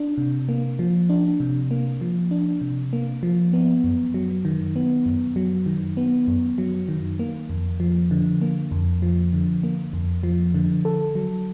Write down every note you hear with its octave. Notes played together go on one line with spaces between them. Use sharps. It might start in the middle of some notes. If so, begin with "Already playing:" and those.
Already playing: D4
C3
A#3
F3
D4
C3
A#3
F3
D4
C3
A#3
F3
B3
F#2
F#3
D#3
B3
F#2
F#3
D#3
B3
F#2
F#3
D#3
A#3
F2
F3
D3
A#3
F2
F3
D3
A#3
F2
F3
D3
A4
F#3